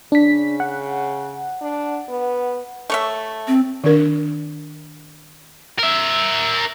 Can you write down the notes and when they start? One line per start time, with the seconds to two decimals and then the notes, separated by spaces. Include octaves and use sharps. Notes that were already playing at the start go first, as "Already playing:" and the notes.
0.12 C#3 D4 B6
0.60 F#5
1.61 D4
2.09 B3
2.90 A3 C#5 E5
3.48 C4
3.84 D#3 D4 A#4
5.79 A#4 E5